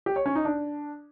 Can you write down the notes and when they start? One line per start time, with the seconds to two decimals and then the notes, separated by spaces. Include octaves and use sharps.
0.06 G4
0.16 C#5
0.26 C#4
0.35 D#4
0.45 D4